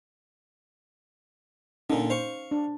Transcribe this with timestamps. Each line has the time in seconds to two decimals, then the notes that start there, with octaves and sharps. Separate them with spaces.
1.90 A#2 D3 C#4 D#4
2.10 C5 F5 C#6
2.51 D4